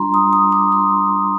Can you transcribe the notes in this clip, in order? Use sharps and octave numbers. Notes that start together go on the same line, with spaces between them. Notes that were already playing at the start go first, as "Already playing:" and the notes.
Already playing: G3 D4 F4 A#5 C6
D#6
D#6
D6
C6